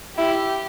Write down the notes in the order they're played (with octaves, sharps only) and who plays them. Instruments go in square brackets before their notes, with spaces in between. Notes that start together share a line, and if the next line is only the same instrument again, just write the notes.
[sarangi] E4 [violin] G4